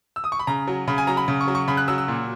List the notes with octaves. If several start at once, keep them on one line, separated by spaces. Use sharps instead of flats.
E6
D#6
C#6
B5
C#3 A#5
F#3
C#3 B5
G#5
F#3 A#5
B5
C#3
C#6
F#3
C#6
C#3 B5
F#6
F#3 E6
E6
A#2